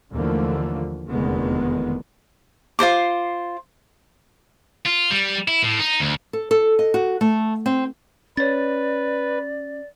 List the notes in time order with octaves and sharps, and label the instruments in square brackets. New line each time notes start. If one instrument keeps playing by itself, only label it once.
[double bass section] D#2 D3 E3 F3 A3 A#3
F1 E2 D3 D#3 G#3 B3
[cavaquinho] F4 A#4 C5 D6
[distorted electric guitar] F4
G3
E4
A2
D#4
D2
[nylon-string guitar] A4
A4
D#5
F#4
A3
C4
[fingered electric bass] C#4 [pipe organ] B4 [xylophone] C#5 A6 [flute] D5